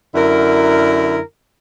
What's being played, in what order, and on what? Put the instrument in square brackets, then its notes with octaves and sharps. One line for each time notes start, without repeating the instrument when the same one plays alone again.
[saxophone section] F#2 D3 E4 A#4